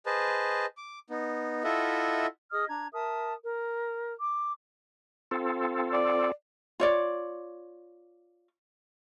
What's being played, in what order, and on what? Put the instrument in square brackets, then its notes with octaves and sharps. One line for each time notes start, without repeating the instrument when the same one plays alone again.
[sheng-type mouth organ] G#4 B4 C5 D#5 A5
D6
B3 D#4
E4 F4 A4 D#5 E5 F#5
[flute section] G#4 D#5 D#6 F6
D4 A#5 G#6
A#4 E5 A5 D#6
A#4
D6
[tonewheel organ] C4 F4 A4
[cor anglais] D5
[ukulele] F4 C#5 D5